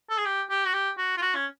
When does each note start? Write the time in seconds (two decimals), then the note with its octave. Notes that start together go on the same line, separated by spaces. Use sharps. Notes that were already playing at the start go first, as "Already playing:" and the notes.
0.10 A4
0.18 G#4
0.25 G4
0.50 G4
0.66 F#4
0.73 G4
0.98 F#4
1.17 F4
1.22 F#4
1.35 C#4